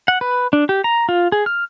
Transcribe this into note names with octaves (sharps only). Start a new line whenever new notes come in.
F#5
B4
D4
G4
A#5
F4
G#4
F6